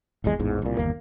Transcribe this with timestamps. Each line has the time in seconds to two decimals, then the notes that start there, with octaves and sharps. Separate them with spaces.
0.24 D1 G#1 E2 G#3
0.39 A1 E2 G#2
0.62 C2 A#2
0.77 G1 D#2 A#3